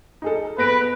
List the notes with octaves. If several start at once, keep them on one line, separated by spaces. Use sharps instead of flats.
D#4 G#4 A4
B3 B4 A#6 D7